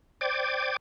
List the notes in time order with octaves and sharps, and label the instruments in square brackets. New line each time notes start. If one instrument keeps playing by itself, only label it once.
[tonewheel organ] C5 D5 G5 D6 G#6